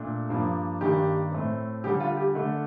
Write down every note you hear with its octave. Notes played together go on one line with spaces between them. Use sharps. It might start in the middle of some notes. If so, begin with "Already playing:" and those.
Already playing: A#2 A3 D4
G2 F3 A#3 D4
G2 D#3 A#3 D4 G4
A2 A3 C4
D3 G3 D4 G4
F4
G4
D3 A3 D4